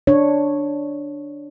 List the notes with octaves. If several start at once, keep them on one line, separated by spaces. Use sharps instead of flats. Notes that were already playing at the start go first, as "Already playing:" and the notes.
D4 C#5